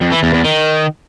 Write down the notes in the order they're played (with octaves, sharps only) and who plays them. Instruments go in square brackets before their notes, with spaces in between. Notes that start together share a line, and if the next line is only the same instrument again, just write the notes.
[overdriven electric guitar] F2
E3
E2
E2
D#3